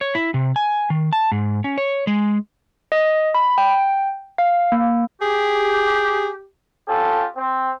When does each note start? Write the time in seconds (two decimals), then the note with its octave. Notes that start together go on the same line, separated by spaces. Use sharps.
0.01 C#5
0.15 E4
0.34 C3
0.56 G#5
0.90 D#3
1.13 A5
1.32 G#2
1.64 C#4
1.78 C#5
2.07 G#3
2.92 D#5
3.34 B5
3.58 G5
4.38 F5
4.72 A#3
5.21 G4 G#4
6.88 C#4 F4 G4 A4
7.36 C4